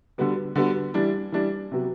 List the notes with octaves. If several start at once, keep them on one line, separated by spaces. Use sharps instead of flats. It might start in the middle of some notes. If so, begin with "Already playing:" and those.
D3 G3 B3 F#4
D3 G3 B3 F#4
E3 G3 D4
E3 G3 D4
C3 F#3 B3 F#4